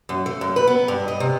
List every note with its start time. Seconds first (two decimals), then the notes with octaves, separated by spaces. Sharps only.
0.09 F#2
0.26 A3
0.41 F#2
0.56 B4
0.67 B3
0.88 G2
1.08 D#5
1.20 C3